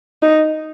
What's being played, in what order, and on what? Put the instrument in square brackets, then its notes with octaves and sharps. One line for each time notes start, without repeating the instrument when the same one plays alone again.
[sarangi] D#4